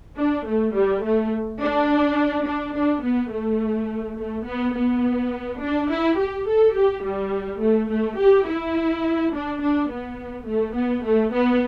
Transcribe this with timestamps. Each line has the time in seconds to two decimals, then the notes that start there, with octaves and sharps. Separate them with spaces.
0.17 D4
0.45 A3
0.74 G3
1.02 A3
1.61 D4
2.45 D4
2.74 D4
3.02 B3
3.31 A3
4.17 A3
4.46 B3
4.75 B3
5.60 D4
5.89 E4
6.17 G4
6.47 A4
6.75 G4
7.04 G3
7.60 A3
7.90 A3
8.18 G4
8.46 E4
9.33 D4
9.61 D4
9.90 B3
10.46 A3
10.75 B3
11.04 A3
11.32 B3